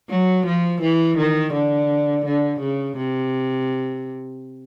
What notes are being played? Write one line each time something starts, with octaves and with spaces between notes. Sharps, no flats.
F#3
F3
E3
D#3
D3
D3
C#3
C3